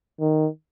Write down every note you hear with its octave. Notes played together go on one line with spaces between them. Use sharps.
D#3